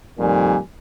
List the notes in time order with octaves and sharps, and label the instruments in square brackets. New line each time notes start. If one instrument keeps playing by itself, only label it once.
[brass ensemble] F2 A#2 D#3 G3 G#5